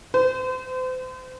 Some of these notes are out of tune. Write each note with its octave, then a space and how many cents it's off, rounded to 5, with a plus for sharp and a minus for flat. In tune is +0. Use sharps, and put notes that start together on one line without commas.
C5 -40